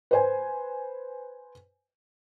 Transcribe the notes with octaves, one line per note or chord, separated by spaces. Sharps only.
B4 C5 G#5